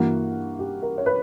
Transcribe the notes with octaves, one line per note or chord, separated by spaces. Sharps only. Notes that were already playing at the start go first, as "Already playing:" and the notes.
Already playing: G2 E3 A#3 F#4
G4
A#4
C#5
B4